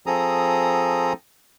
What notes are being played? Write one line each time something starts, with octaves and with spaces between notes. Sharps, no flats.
F3 C4 G#4 A4 A#5 D#6